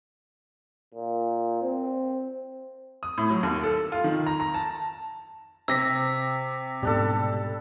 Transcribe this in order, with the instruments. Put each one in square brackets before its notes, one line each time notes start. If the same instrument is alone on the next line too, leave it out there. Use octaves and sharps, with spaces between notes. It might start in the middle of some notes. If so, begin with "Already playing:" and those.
[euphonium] A#2
C4
[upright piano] D#6
A2
F#3
D#2
A4
F4
D#3
A#5
A#5
A5
[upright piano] C3 C4 [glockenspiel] E6 A#6 B6
[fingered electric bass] G#2 B2 [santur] G3 D4 A4